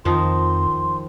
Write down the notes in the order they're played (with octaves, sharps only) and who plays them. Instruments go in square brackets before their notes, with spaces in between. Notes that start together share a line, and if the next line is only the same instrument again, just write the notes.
[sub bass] F2 [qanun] D#3 F3 D#4 [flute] C6